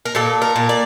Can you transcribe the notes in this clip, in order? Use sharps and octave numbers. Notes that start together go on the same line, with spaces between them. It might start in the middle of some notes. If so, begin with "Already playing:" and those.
A#4
A#2 A4
A#4
A#2
D5